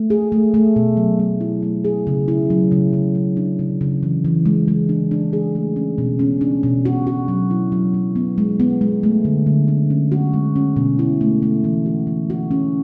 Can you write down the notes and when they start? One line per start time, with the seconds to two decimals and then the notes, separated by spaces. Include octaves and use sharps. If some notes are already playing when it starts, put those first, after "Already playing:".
Already playing: A3
0.10 G#4
0.32 A3
0.54 A3
0.76 B2
0.97 F#3
1.19 A3
1.41 E4
1.63 A3
1.85 G#4
2.07 C#3
2.28 E4
2.50 F#3
2.71 C#3
2.93 C#3
3.15 C#3
3.37 D4
3.59 C#3
3.81 C#3
4.03 E3
4.25 E3
4.46 G#3
4.68 G#3
4.89 D4
5.11 D4
5.33 G#4
5.55 A3
5.76 C#4
5.98 B2
6.19 C#4
6.41 D4
6.63 B2
6.85 F#4
7.07 F#4
7.28 F#3
7.51 E4
7.72 F#3
7.94 F#3
8.16 B3
8.38 G#3
8.60 B3
8.81 G#3
9.03 A3
9.25 D3
9.47 D3
9.68 D4
9.90 C#4
10.12 F#4
10.33 G#3
10.56 C#4
10.76 B2
10.99 E4
11.21 A3
11.42 A3
11.64 E3
11.86 F#4
12.07 E3
12.30 F#4
12.51 C#4